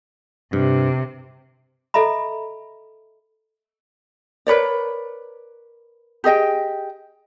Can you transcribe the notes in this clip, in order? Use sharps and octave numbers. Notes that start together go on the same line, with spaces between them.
G2 C3
A4 D#5 E5 A#5 B5
A#4 B4 C#5 D5
G4 G#4 D#5 G5